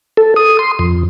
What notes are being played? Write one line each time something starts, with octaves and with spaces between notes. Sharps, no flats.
A4
D#6
C6
F2